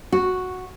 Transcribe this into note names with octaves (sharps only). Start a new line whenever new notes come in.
F#4